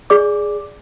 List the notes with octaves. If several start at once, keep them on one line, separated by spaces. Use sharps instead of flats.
G#4 D5 D6